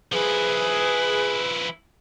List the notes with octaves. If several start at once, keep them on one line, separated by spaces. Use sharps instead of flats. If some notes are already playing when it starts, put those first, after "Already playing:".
F3 E4 G#4 B4